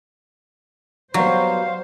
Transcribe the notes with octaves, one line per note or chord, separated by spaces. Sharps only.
F#3 G3 B3 C5 F5